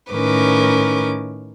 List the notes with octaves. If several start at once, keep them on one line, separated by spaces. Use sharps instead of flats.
A2 D#3 C#4 A#4 B4 D6